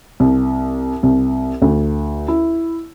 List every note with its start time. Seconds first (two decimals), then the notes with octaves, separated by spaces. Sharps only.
0.20 C2
1.03 C2
1.62 D2
2.28 E4